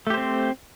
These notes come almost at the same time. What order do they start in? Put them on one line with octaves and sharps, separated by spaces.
A3 G4 C5 C4